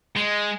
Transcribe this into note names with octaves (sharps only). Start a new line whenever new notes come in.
G#3